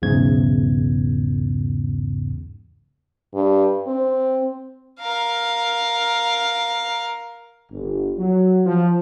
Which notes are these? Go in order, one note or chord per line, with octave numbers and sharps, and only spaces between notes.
B1 E2 G#2 C#3 G#6
G2
C4
A#4 F5
G1
F#3
F3